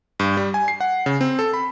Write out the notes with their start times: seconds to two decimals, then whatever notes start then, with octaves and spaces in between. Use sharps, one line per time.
0.20 G2
0.37 G3
0.54 G#5
0.68 C7
0.81 F#5
1.06 C#3
1.21 C4
1.39 A4
1.54 B5